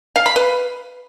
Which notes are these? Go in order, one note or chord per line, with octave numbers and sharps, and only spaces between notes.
F5
B5
B4